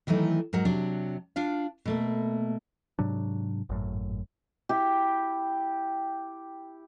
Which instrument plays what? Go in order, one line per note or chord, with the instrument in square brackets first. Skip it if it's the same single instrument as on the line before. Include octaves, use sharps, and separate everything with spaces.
[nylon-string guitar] D#3 E3 F#3 A3 D#4
G#2 F#3 A#4 F#5
C3 F#3 D4
D4 F4 F5
B2 A3 A#3
[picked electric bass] G#2 C3 F#3 D4
G#1 F#2 A2
[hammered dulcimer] E4 G4